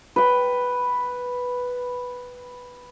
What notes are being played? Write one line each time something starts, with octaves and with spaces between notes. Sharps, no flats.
B4 G5